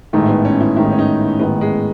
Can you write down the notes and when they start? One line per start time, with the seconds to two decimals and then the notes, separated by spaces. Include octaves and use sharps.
0.13 A1 G#2 D#3 A3
0.29 B3
0.45 C#4
0.61 E4
0.77 A1 G#2 D#3 E4
0.84 D#4
0.92 C#4
0.99 D#4
1.40 A1 G#2 D#3 B3
1.61 G#3